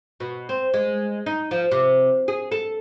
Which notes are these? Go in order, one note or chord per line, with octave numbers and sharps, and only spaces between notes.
B2
C4
G#3
D#4
F3
C3
G#4
A4